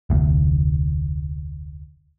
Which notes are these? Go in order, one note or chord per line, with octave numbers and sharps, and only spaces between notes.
F1 D2